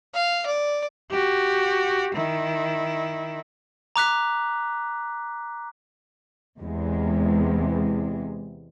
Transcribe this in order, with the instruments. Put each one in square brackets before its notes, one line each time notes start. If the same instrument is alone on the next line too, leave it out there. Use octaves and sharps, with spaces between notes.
[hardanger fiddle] F5
D5
[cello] F#4 G4
D#3 E4
[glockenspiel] A#5 D6 F#6 B6
[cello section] E2 C3 G#3